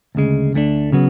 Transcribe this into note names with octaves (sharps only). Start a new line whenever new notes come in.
D2 C#3 G#3
D2 D3 A3 D4
C#3 F#3 B3